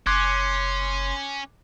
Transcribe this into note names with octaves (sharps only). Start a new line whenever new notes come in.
F#1 C#4 C6 D6 F#6 G#6